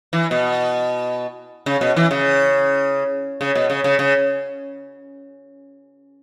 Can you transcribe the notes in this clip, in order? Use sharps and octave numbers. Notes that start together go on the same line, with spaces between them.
E3
B2
C#3
B2
E3
C#3
C#3
B2
C#3
C#3
C#3